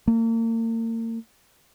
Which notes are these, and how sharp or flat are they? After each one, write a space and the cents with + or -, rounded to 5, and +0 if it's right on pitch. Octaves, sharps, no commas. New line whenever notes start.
A#3 -40